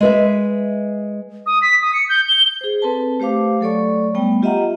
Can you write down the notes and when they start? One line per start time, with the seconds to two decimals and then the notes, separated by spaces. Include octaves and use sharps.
0.01 G#3 B4 E5
1.46 D#6
1.62 B6
1.82 D#6
1.94 C#7
2.09 G6
2.28 G7
2.61 G#4 C5
2.82 C4 A4 B4 A5
3.20 A3 G4 C5 F5 D6
3.60 F#3 A3 A4 C#5 D5 C#6
4.14 G3 A3 B3 G5
4.42 F4 G4 D#5 E5 F#5 A#5